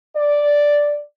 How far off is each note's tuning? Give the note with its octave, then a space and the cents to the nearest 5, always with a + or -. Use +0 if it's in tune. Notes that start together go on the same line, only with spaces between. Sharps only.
D5 -5